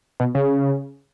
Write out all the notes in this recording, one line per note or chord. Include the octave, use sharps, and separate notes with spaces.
B2
C#3